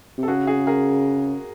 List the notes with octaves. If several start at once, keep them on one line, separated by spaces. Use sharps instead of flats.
C3
A4
C#3 F#4 G#4
F#4 G#4
G#4 A#4